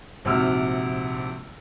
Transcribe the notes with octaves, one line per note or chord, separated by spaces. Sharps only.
A#1 G#2 C3 F#4 E6 F6